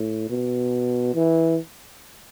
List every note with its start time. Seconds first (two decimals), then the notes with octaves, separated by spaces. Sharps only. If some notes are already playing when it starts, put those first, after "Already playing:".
Already playing: A2
0.30 B2
1.14 E3